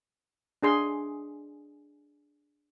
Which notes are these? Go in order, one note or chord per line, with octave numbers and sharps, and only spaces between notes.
D4 G#4 C6